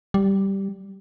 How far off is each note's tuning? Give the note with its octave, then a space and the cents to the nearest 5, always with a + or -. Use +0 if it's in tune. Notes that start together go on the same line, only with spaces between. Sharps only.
G3 -5